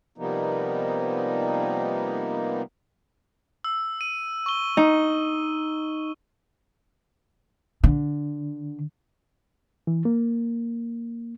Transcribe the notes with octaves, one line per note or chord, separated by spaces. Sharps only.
C3 F3 G3 A#3 B3 D#4
E6
D#7
C#6 G7
D#4
D3
E3
A#3